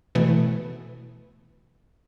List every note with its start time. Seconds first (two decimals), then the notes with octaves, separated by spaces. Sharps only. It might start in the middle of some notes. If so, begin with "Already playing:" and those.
0.15 B2 E3 A3